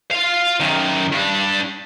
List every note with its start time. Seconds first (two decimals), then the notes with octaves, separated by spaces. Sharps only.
0.11 F4 F5
0.60 F#2 D#3
1.12 G2 D4